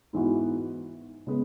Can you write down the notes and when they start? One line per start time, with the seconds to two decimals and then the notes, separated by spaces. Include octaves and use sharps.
0.13 G#2 E3 B3 F#4
1.27 C#3 G#3 B3